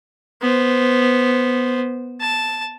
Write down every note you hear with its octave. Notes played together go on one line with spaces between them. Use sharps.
B3 C5
A5